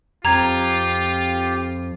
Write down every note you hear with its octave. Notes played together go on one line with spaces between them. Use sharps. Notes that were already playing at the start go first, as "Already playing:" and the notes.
F2 F4 G4 A#5 G#6